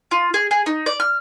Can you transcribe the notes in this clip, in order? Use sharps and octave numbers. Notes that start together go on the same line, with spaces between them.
F4
G#4
G#4
D#4
D5
F6